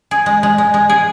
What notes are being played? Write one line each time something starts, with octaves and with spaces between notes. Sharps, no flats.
G#4
G#3
G#3
G#3
G#3
G#4